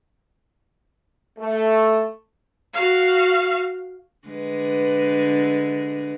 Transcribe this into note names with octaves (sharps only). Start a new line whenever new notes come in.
A3
F#4 F5
D3 G#3 B4